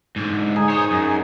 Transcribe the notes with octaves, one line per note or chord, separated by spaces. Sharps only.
G#2 D3
D#4 G#4
C5 C#5
F#2